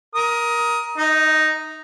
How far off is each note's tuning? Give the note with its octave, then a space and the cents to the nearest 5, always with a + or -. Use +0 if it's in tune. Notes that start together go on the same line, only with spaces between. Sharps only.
A#4 +15 D#6 +20
D#4 +0 D#5 +40